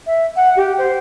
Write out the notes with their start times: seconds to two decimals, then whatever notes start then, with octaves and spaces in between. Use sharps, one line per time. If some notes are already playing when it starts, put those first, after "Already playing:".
0.07 E5
0.36 F#5
0.57 G4
0.78 C5